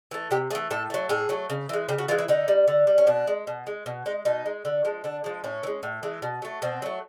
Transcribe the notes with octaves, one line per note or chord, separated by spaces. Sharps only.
E3 A3
C3 G4
E3 A3 G#4
A2 A4
F#3 A3
A2 G#4
F#3 A3
C#3
E3 G#3
C#3 G4
F#4
E3 G#3 F4
E4
D3 D#4
G3
D3
G3
C#4
B2 D4
G#3
B2
G#3
B2
G#3 D#4
B2 D#4
G#3
D3
F3 G#3
D3 D4
F3 G#3
A2 C#4
E3
G#3
A2
E3 G#3
B2
F#3 A3
B2 C4
F#3 A3